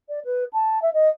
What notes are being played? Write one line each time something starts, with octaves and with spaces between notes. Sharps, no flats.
D5
B4
A5
E5
D#5